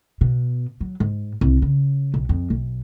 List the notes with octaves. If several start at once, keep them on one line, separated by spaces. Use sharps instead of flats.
B2
F#3
G#2
C2
C#3
B1
F2
B1